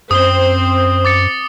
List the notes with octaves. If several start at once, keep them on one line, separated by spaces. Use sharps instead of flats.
F#2 C4 C5 D#6 G7
D6 A6 C#7